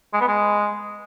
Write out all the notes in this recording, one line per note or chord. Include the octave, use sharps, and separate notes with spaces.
G#3
B3
G#3